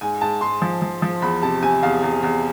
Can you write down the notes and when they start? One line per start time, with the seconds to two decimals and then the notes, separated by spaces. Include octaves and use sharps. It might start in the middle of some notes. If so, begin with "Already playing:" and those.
0.01 G#2 G#5
0.21 G#2 A5
0.41 G#2 C6
0.62 F3
0.82 F3
1.02 F3
1.22 E2 B5
1.42 C3 A5
1.63 C3 G#5
1.83 E2 F5
2.03 E2
2.23 E2